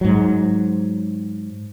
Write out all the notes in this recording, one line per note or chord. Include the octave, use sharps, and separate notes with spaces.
G#2 F#3